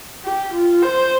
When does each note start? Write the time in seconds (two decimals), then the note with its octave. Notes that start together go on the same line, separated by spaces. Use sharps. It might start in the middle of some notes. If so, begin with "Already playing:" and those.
0.24 G4
0.54 F4
0.83 C5